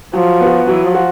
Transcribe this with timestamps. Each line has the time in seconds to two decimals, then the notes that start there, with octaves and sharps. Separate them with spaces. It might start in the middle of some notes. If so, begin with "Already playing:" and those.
0.13 F3 F#3
0.41 B3 F#4
0.67 F3 F#3
0.94 F#4